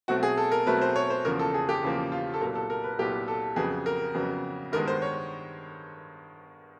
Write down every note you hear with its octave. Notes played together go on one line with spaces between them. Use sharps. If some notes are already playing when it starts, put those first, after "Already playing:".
B2 F#3 A3 C4 F#4
G#4
A4
A#4
B2 F#3 A3 C4 B4
C5
C#5
C5
E2 C#3 F3 A#3 A#4
A4
G#4
G4
E2 C#3 F3 A#3
F4
A4
C2 A#2 F#3 B3 A#4
A4
A#4
B4
C2 A#2 F#3 B3 G4
A4
F2 C#3 F#3 B3 G#4
A#4
F2 C#3 F#3 B3
G2 D#3 G#3 B3 A#4
C5
C#5